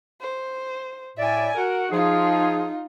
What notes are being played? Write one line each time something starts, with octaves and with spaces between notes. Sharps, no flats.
C5
A2 D5 E5 G#5
F#4 A#4 F#5
F3 D#4 F4 G#4